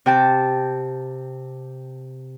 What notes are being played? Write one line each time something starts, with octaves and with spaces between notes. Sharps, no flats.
C3 G5 A5